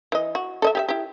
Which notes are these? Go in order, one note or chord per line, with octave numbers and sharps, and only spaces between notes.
E3 D#5
F#4
A4 D#5 E5
G4 G#4 E5
E4 G4